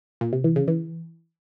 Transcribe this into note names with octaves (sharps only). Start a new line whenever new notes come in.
A#2
C3
E3
C#3
E3